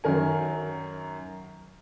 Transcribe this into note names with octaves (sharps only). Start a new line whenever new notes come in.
F#2 D#3 A#4 G#5